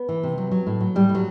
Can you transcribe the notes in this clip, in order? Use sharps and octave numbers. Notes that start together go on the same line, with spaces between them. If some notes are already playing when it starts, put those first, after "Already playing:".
Already playing: B3
E3
C3
F#3
F#3
A2
F#3
A2 G3
A2
F#3